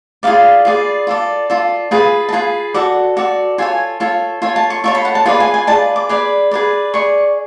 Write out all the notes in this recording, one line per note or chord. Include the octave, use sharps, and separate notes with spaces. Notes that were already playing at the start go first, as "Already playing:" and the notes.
F4 G#4 B4 D5 F5
F4 G#4 B4 D5
F4 A4 D5
F4 A4 D5
F4 G#4 B4
A5
F4 G#4 B4 G#5
F#4 A4 D5 F#5
F#4 A4 D5
F4 A4 C#5 G#5
F4 A4 C#5
F4 A4 C#5 G#5
A5
C#6
F4 A4 C#5 C#6
B5
F#5
A5
F4 G#4 B4 D5 G#5
G#5
G#5
F4 G#4 B4 D5 A5
D6
G#4 B4 D5
G#4 B4 D5
G#4 D5 C#6